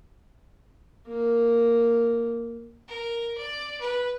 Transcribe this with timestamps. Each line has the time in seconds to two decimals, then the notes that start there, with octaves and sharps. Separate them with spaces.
1.07 A#3 A#4
2.88 A#4
3.38 D5
3.80 B4